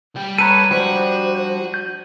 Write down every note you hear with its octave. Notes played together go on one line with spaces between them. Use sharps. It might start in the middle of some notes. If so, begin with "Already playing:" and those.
G3 G4
A4 B4 C#5 A#5 D#7
F3 G3 D4 F#4 C5
G6